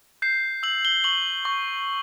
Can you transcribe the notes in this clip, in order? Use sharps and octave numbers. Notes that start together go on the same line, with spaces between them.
G6 C7
E6 F#7
G7
C#6 F#7
C#6